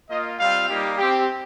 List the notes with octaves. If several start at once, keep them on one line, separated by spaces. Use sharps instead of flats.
A#3 F4 D#5
G3 C4 F4 F5
G3 A#3 D#4 G4
C4 G4